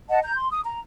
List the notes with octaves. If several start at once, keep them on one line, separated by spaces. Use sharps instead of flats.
D#5 F#5 A5
A#5 G6
C6
D#6
A#5